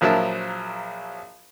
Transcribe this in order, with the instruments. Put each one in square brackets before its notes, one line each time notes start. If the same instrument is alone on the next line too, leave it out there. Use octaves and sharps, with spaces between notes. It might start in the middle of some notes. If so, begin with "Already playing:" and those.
[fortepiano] A#1 F3 F#3 A#4 E5 A5